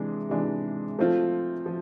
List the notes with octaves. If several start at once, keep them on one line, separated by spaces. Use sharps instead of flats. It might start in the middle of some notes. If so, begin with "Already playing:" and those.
Already playing: C3 E3 G#3 D4
C3 E3 G#3 D4
F3 A3 C4 F4
F3